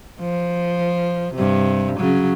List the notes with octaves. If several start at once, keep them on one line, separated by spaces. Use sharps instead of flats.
F3
G2 C3
C#3 F#3